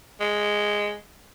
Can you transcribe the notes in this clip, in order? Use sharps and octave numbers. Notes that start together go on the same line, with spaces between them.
G#3